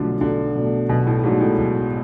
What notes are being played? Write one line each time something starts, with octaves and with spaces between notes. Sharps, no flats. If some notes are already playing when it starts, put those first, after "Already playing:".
Already playing: B1 B2 D3 F3 F#3 A3 D4
B1 D3
B2 F#3 A3 D4
B1 B2
A2
G#2 B2 F#3 A3 D4
A2
B1